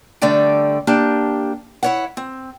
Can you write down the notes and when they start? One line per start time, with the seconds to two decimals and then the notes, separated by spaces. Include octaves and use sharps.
0.22 D3 G3 A3 D5 G5
0.87 A#3 D4 G4 A5
1.83 E4 C#5 F#5
2.17 C4